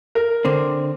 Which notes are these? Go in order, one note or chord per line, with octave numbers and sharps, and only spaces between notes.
A#4
D3 C4